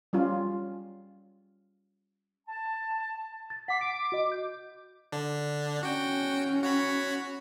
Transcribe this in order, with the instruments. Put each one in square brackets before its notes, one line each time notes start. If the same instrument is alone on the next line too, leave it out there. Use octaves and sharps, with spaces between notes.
[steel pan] G3 C#4 F4
[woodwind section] A5
[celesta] A6
[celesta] F#5 D6 C7 [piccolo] B6
[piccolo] D6 [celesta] D7
[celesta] F#4 D#5
G6
[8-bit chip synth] D3 D4
[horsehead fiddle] C#4 [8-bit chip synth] F#4 G5
[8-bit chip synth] F#4 C#5 B5